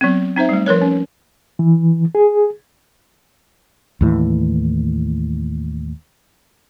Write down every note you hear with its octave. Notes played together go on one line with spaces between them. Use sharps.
F#3 B3 C4
C4 D#4 C5 E5
G3 A3
F3 A#4 B4 C#5
C#4
E3
G#4
D#2 A2 E3